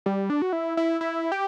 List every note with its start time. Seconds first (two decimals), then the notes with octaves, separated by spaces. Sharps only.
0.06 G3
0.30 D4
0.42 F#4
0.53 E4
0.77 E4
1.01 E4
1.32 G4